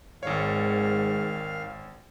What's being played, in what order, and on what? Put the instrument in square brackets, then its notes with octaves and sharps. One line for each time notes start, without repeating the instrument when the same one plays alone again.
[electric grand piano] G#1 C#5 [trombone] G#2 [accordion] D#3 F5